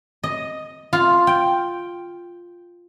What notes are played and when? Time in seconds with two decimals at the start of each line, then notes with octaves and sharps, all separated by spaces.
0.24 D#5
0.93 F4
1.27 G5